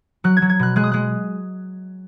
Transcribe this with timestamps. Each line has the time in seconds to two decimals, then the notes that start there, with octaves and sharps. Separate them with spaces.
0.24 F#3 F#6
0.37 G#6
0.42 F#3
0.49 G#6
0.59 B2 F#6
0.76 G#3 F#6
0.84 D#6
0.92 G#3 F#6